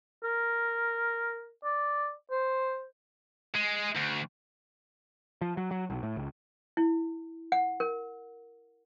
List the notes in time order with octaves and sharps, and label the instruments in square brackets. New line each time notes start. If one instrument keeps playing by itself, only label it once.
[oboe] A#4
D5
C5
[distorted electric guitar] G#3
D2
[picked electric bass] F3
F#3
F#3
B1
A2
C#2
[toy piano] E4
F#5
A#4